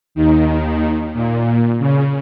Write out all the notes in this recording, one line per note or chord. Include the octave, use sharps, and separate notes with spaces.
D#2 D#3
A#2
C#3